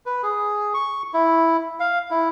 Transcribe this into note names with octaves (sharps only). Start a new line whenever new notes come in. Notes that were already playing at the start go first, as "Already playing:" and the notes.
B4
G#4
C#6
E4
F5
E4